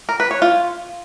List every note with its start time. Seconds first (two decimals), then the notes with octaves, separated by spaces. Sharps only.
0.09 A#4
0.20 B4
0.31 C#5
0.42 F4